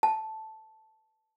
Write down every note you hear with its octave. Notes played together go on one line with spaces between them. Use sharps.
A5